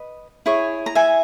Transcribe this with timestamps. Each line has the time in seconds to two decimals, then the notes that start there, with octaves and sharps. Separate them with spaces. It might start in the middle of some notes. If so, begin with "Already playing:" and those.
Already playing: B4 D#5
0.46 E4 G#4 C#5
0.86 A#5
0.95 E5 G#5